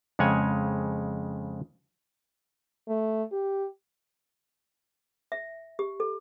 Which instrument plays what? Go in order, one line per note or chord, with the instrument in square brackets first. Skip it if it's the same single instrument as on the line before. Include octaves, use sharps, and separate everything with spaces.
[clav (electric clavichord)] F2 C#3 G#3 C#5 F#5 G#5
[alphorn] A3
G4
[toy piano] E5
G4
A4